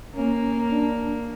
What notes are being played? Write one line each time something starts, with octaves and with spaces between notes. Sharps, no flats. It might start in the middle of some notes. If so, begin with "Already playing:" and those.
A#3 C#4
D4